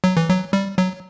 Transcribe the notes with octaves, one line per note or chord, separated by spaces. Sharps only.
F#3
E3
F#3
G3
F#3